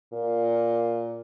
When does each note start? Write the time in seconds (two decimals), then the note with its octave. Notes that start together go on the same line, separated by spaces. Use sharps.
0.13 A#2